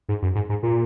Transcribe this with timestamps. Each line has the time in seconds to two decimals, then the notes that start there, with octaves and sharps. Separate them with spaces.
0.09 G#2
0.22 F#2
0.35 G#2
0.49 G#2
0.63 A#2